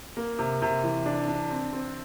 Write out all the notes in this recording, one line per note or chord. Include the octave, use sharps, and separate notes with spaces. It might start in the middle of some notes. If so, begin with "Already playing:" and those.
A#3
C3
C3
E3
D4
D4
C4
C4